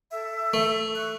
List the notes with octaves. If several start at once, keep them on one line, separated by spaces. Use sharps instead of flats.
A4 E5
A3
C#6 F#6